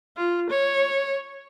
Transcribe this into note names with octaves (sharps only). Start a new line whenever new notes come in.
F4
C#5